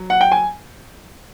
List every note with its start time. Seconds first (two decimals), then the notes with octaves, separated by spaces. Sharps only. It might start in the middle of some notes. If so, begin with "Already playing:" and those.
Already playing: F#3
0.10 F#5
0.21 G5
0.32 G#5